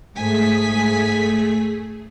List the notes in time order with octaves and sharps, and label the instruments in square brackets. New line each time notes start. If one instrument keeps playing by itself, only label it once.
[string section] G#2 G#5 B6 [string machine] A3 G#4